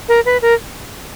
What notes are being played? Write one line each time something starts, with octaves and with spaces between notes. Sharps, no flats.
A#4
B4
A#4